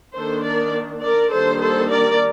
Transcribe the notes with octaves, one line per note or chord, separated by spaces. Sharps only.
D#3 A#3 D4 A4 C5
A#4 D5
A#4 D5
D#3 G3 A#3 D4 A4 C5
A4 C5
A#4 D5